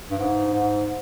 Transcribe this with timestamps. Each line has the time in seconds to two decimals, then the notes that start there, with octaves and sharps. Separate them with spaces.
0.10 G2
0.19 G#2
0.53 G#2